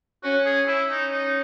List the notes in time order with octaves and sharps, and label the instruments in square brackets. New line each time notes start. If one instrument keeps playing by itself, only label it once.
[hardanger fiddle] C#4 [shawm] F#4
[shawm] G#4
[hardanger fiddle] C#4 [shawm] E4
[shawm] D#4
D#4